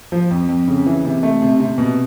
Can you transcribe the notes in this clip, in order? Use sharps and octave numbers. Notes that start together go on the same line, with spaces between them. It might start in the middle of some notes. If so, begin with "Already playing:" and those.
F3
F2
F2
C#3
E3
C3
A3
C3
C3
B2